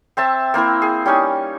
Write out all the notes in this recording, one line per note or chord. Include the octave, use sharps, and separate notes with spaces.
C4 E5 A5
A#3 C4 E4 A#4
G#4
G3 C#4 D#4 G#5